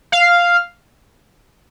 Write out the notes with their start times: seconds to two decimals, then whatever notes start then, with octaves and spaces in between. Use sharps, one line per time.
0.12 F5